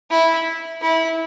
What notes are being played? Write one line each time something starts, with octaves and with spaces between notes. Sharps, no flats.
E4
E4